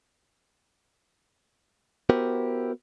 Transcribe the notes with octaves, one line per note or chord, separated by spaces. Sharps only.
B3 E4 F#4 G4 A#4 C5